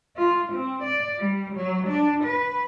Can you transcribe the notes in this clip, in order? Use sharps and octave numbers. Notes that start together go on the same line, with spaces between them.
F4
C4
D5
G3
F#3
D4
B4